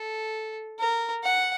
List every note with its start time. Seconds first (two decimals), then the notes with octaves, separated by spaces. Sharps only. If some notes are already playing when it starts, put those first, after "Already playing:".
Already playing: A4
0.80 A#4
1.23 F#5